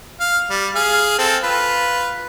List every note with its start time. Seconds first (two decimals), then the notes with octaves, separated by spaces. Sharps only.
0.20 F5
0.50 G3
0.75 G#4 F5
1.18 C4 A4
1.44 F4 B4